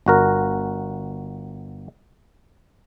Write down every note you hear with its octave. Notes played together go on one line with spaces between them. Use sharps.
G1 F#4 A#4